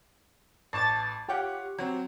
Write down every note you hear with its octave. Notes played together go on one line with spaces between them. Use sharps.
A1 A5 C#6 D6 A6
F4 G4 C#5 F#5
F#3 C4